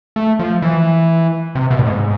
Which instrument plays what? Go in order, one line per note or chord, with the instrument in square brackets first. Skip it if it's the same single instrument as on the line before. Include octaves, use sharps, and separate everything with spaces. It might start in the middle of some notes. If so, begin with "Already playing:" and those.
[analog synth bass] A3
F3
E3
C3
B2
A2
G#2